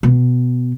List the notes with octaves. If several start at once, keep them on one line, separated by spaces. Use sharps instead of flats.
B2